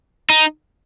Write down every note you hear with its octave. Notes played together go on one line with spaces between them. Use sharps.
D#4